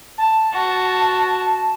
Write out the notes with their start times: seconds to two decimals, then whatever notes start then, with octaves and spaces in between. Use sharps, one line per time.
0.18 A5
0.53 F#4